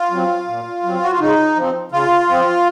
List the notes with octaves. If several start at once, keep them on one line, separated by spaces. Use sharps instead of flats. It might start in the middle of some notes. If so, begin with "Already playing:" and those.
Already playing: F4
F#3 C4
A#2
F#3 C4
F#4
F4
C#3 D#4
F3 C4
C#3 F4
F3 C4